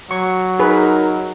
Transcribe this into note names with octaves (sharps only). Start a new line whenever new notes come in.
F#3 C#6
D#4 G#4 A#4 B4